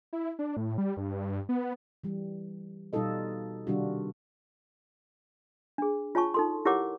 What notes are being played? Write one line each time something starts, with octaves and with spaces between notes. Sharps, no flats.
E4
D4
A2
G3
G2
B3
E3 G3
B2 G3 D#4 F4 A4 D#5
C3 D#3 G3 D4 F4 F#4
D4 G#4
F4 C#5 G#5 A5 C#6
D#4 A4 C6
E4 G4 A#4 C#5 F#5 D6